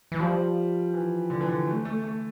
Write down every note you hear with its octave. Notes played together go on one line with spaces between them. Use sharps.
E3
F3 G3
E3
D3
E3
D3
A3
A3
A3